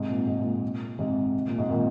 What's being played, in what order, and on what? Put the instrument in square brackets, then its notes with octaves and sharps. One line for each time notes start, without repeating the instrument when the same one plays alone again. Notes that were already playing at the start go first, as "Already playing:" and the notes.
Already playing: [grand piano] G#2 C3
A#2
G#2
A#2
G#2 C3
A#2
G#2 C3
A#2 D#3